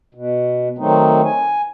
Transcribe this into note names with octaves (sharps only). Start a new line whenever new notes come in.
B2
D#3 F#3 A3 C4 D#4
G#5